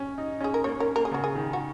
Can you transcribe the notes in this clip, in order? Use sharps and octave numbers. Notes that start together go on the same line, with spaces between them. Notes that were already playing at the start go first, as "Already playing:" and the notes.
Already playing: C#4
D#4
C#4
G#4
A#4
A#3 C#5
C#4 A#4
A#3 A#4
G#4
C#3
F#4
G#4
D#3
F#4